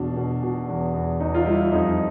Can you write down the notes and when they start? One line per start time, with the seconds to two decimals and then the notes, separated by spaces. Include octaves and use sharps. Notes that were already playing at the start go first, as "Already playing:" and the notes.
Already playing: E2 B2 D4
0.16 B2
0.42 B2
0.68 E2
0.94 E2
1.20 E2 D#4
1.34 F4
1.46 G3 E4
1.71 F2 D#4